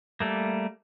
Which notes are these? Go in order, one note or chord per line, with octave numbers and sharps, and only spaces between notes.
G3 A3 A#3